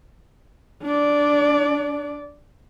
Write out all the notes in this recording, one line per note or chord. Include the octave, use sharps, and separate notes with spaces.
D4 D5